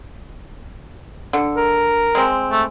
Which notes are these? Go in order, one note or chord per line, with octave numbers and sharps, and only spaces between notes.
D3
A#4
G#3 C4
A3